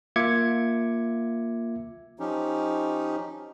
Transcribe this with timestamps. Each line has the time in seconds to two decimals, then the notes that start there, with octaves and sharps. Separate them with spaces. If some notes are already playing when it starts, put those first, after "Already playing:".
0.16 A#3 F4 E5 D6 G#6 C#7
2.20 F3 C#4 D#4 G4